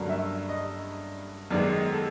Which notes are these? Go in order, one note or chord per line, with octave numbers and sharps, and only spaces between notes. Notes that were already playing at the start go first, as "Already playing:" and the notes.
Already playing: G2 D3 F#3 A#3 C#4
E5
D#5
F#2 D#3 G#3 B3 D5
D#5
A4